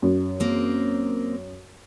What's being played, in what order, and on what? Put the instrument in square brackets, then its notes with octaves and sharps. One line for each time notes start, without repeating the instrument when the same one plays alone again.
[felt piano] F#2
[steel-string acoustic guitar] A#3 C4